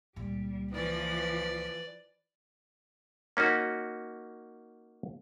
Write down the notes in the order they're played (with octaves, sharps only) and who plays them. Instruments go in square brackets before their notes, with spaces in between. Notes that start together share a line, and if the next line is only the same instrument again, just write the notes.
[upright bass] C#2 A#2 [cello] G3
[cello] E3 F3 [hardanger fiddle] B4 D5
[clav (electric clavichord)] A#3 C#4 D#4 F#4